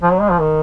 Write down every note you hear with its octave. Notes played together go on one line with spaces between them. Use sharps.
F3
F#3
G#3
F3
D#3